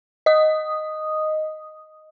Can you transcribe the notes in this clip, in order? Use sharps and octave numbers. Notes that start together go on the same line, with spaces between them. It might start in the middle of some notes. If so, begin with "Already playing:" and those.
D#5 D#6